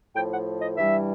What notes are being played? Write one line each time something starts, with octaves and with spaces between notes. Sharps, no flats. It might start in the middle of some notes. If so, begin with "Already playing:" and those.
A2 F3 G5
F#5
D#5
G2 E3 G3 E5